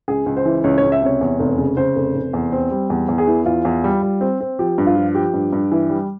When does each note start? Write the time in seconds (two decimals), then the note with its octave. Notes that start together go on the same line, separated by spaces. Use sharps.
0.08 C#2 G#4
0.26 C#2
0.36 C5
0.45 E3
0.64 C#2 C#5
0.78 C#5
0.83 C#2
0.92 E5
1.02 C3 C#5
1.21 E2
1.40 F1
1.58 C#3
1.77 C#3 C5
1.96 F1
2.15 F1
2.33 E2
2.52 C4
2.71 G3
2.90 E2
3.08 E2
3.18 G#4
3.27 E3
3.46 E2 F4
3.65 E2
3.84 G3
4.03 G3
4.21 C4
4.40 C4
4.59 F3 G4
4.78 G2
4.87 F4
4.96 F3
5.15 F3 G4
5.34 G2
5.53 G2
5.72 E3
5.90 G3